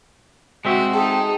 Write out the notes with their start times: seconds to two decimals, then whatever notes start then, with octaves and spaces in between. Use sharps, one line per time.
0.65 G#3 C4 F#4 E5
0.94 D#4 G#4 A4 G5